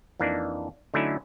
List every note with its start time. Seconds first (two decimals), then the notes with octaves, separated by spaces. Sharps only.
0.20 F2 E3 A#3 D4 D#4
0.94 D3 F#3 A3 C#4 D#4 E4